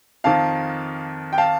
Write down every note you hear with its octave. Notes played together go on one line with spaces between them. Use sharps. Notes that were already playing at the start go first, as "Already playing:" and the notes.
F2 D#3 F5 A5
G5
F5 A5